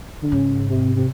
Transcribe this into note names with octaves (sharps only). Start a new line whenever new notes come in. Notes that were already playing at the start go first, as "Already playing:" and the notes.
D3
G#2 C#3
C3
C3